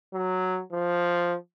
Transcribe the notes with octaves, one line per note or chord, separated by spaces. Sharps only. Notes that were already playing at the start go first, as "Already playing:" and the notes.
F#3
F3